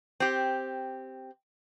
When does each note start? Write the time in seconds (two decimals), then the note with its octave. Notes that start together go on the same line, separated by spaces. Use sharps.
0.20 C4 G4